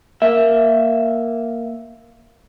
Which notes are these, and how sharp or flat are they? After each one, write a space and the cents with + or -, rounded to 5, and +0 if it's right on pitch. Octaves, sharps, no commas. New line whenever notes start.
A#3 +0 E5 +0